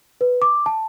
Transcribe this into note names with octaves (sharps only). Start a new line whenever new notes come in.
B4
D6
A5